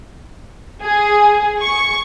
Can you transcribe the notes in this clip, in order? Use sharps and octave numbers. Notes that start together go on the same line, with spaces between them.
G#4
C#6